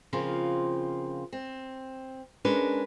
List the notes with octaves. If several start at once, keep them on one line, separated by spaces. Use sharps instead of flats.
C#3 F3 A#3 C4 F4
C4
G#3 C#4 D4 A#4 B4